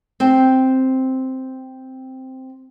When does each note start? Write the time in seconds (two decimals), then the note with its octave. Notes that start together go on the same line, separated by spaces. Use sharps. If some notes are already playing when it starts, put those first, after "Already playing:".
0.20 C4 G5